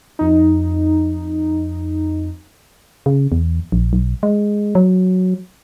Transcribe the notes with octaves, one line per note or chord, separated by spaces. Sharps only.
F2 D#4
C#3
E2
A#1
B1
G#3
F#3